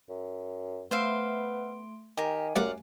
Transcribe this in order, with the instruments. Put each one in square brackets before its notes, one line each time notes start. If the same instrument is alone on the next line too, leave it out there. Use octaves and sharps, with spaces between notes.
[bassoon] F#2
[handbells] A3 C6 D7 [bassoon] B3 [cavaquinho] C5 E5 F5
[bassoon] D#3 [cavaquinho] G4 A#4 [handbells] G#5
[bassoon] F#2 [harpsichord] G3 A3 A#3 [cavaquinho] D5 F5 F#5